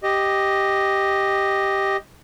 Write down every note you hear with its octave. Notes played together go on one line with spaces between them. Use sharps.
G4 D#5